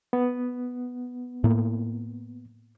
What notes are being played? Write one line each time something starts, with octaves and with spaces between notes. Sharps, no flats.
B3
A2 A#3